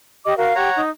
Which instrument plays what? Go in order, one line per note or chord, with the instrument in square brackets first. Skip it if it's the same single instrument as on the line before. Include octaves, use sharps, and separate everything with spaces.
[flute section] G4 D#5 D6
F#4 A#4 F5
[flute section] G4 [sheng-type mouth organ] C#5 F#5 A#5
[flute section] D#4